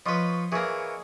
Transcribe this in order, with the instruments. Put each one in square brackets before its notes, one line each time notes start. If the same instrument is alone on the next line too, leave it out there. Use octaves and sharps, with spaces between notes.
[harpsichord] F3 B4 [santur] C#5 D#5 C6
[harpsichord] E3 A#3 [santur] G#4 C#5